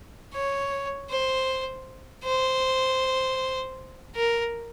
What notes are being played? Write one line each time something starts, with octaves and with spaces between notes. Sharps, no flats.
C#5
C5
C5
A#4